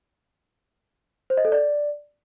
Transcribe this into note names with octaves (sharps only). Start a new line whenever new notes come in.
C5
D#5
A4
D5